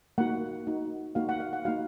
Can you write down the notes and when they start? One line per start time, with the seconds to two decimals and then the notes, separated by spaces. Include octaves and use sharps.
0.18 A#3 D#4 F#4 F#5
0.67 A#3 D#4 F#4
1.15 A#3 D#4 F#4 F5
1.29 F#5
1.40 F5
1.53 F#5
1.65 A#3 D#4 F#4 F5